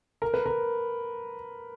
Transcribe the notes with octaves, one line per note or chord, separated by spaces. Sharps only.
A#4
B4
A#4